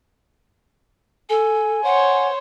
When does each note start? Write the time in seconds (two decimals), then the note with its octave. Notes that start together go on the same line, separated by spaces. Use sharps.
1.30 A4 G#5
1.84 C5 C#5 F#5